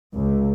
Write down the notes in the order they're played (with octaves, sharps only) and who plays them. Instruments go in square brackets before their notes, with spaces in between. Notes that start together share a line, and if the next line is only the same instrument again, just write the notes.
[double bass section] C#2